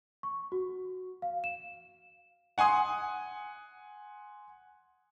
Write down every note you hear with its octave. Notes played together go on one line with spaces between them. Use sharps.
C#6
F#4
F5
E7
F#5 G#5 C6 D#6